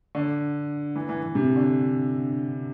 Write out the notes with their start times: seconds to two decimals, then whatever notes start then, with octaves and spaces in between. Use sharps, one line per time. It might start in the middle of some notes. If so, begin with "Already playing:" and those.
0.15 D3
0.96 E3
1.09 E3
1.23 E3
1.35 C3
1.56 D3